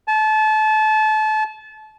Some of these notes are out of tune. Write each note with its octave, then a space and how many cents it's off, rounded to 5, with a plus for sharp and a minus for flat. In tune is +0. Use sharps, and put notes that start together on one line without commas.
A5 -30